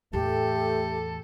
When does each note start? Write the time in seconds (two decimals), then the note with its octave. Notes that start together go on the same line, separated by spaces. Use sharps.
0.13 E2 A2 A3 G4 A4